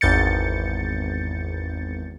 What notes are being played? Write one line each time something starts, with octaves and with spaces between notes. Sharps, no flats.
G#1 E2 G6 A6 C#7